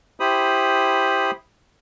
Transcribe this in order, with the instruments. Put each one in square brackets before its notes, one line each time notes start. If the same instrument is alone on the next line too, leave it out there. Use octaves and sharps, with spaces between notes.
[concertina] E4 G4 C5 B5 D#6